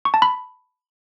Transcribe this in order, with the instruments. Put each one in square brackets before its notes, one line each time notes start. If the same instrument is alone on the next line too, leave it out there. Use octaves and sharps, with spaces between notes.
[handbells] C#6
A5
B5